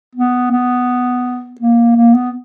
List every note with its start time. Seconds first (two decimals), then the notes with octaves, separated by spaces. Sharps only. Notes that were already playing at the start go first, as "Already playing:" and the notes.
0.15 B3
0.51 B3
1.60 A#3
1.96 A#3
2.14 B3